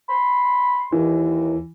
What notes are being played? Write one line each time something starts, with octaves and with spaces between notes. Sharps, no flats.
B5 C6
D#2 E3